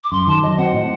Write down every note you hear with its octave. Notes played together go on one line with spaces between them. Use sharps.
D6
F#2 C6
D#3 A5
F#3 D#5
C4 F#5
A2